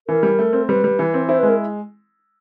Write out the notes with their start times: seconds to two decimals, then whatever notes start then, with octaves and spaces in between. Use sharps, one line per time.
0.07 E3 A#4
0.23 G3
0.39 A3
0.53 C4
0.69 G3 B4
0.84 G3
0.99 E3
1.14 C4
1.28 E4 C5
1.38 B4
1.43 G#3
1.49 A#4